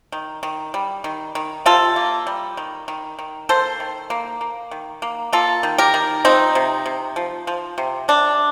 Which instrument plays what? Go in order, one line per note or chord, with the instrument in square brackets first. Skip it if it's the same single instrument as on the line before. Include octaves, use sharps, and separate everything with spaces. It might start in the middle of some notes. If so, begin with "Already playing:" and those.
[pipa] D#3
D#3
G3
D#3
D#3
C3 F4 A4
A#3
G3
D#3
D#3
D#3
A#3 A4 C5
D#3
A#3
A#3
D#3
A#3
A#3 F4 A4
D#3
G4 A#4
D#3
F3 C4 D#4
C3
C3
F3
F3
C3
C3 D4